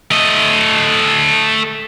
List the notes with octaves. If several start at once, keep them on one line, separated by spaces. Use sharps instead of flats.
A3 D#5